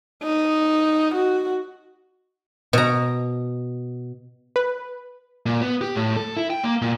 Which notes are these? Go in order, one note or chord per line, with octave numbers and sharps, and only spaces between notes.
D#4
F#4
B2 A#5
B4
A#2
B3
G4
A2
A4
E4
G5
A#3
A#2